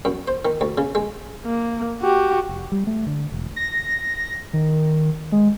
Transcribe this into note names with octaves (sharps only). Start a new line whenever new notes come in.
F#2
C5
D#3
D2
C#3
G#3
A#3
F#4 G4
F1
G3
A3
D3
E1
A#6
D#3
G#3